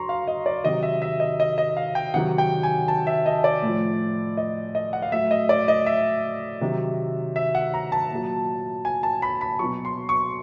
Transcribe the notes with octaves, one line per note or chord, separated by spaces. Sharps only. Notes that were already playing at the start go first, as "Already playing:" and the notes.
Already playing: F#3 A#5 C6 C#6
F5
D#5
D5
C3 D#3 F#3 D#5
E5
E5
D#5
D#5
D#5
F5
G5
C3 D#3 F#3 F#5
G5
G#5
A5
E5
D#5
D5
A2 F3
D#5
D#5
F#5
F5
A2 F#3 E5
D#5
D5
D#5
E5
C3 D#3 F#3
E5
F#5
A#5
A5
A#2 F#3
G#5
A5
B5
B5
B2 F#3 C#6
C6
C#6